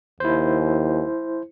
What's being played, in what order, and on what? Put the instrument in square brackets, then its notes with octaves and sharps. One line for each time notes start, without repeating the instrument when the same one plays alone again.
[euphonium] D#2 [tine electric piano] E4 C5